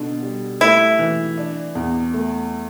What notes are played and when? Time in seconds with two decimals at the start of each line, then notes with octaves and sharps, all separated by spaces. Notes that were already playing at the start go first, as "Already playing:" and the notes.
Already playing: B2 D3
0.23 G3
0.61 A3 E4
0.99 E3
1.38 D4
1.75 E2
2.14 A3